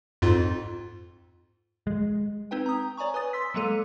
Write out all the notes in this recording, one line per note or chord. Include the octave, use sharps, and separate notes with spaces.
F2 G#2 F4
G#3
C4 D#4 B4 G5
A#5 D#6
C#5 D5 G#5 A#5 C#6
B4 G#5 D#6 A6
C6 E6 B6
F#3 G#3 A#3 A4 D#7